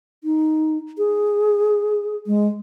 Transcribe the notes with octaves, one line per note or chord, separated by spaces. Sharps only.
D#4
G#4
G#3